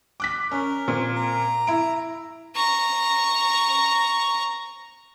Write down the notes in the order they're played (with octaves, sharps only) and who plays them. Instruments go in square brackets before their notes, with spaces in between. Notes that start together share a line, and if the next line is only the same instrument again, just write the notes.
[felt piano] D6 F#6 B6
[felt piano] C#4 [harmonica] A#4
[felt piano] A#2 C4
[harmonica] A#5
[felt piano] E4 D7
[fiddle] A#5 C#6